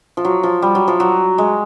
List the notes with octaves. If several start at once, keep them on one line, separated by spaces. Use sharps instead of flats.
F3
F#3
F3
G3
F#3
F3
F#3
G#3